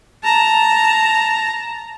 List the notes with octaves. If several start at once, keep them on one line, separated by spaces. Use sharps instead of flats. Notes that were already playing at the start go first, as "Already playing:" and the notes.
A5 A#5